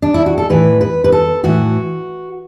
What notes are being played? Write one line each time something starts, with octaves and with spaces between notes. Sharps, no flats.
D4
E4
F#4
A4
A2 E3 A3 B4
B4
B4
A4
A2 E3 A3 F#4